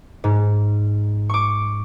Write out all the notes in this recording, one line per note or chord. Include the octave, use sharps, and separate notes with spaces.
G#2
C#6 D6